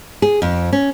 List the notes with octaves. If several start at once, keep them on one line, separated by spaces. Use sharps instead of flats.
G#4
F2
C#4